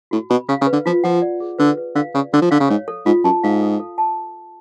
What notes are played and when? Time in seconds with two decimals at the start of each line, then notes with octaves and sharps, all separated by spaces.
0.11 A2 F#4
0.30 B2 B5
0.48 C#3 F5
0.61 C#3
0.66 B4
0.72 D3
0.86 F3 F4
1.04 F3 F#5
1.22 D5
1.40 G#4
1.59 D3 B4
1.77 B4
1.95 D3 F5
2.14 C#3 D5
2.33 D3 F#4
2.42 F3
2.51 D3 F5
2.60 C#3
2.69 G#2 C#5
2.88 A4
3.06 G#2 F4
3.24 F#2 A5
3.43 G#2 F5
3.61 A4
3.80 A4
3.98 A5